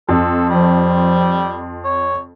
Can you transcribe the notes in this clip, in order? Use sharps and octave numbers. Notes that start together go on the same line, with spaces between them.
F2 A4
F3 G3
C#5